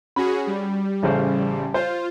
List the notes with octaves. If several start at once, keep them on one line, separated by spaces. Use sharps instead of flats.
C#4 F#4 G#4 B5
G3
A1 C#3 C5
F4 C5